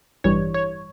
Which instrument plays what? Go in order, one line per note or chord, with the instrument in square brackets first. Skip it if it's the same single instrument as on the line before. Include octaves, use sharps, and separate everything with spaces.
[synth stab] A1 G2 E3 G3 C#5
C#5